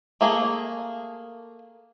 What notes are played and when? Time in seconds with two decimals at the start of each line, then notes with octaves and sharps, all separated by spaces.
0.21 A3 A#3 G#4